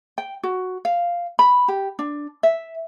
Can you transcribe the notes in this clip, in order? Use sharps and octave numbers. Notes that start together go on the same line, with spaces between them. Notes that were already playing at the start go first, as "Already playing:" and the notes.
G5
F#4
F5
B5
G4
D4
E5